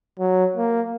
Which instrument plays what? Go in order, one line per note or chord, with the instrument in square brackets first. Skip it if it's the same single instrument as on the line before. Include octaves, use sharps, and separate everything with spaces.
[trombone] F#3
A#3